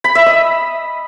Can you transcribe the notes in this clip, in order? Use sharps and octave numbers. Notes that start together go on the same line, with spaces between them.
B5
E5
D#5